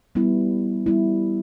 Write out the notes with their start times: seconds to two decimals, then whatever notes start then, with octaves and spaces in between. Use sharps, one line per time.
0.15 G3 B3 E4
0.86 G3 B3 E4